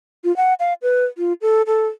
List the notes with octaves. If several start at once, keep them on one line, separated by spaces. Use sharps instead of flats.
F4
F#5
F5
B4
F4
A4
A4